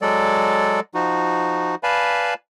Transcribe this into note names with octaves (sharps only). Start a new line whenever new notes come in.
F#3 G#3 A4 D5
F3 D#4 F#4
B4 D5 F5 G#5 A5 B5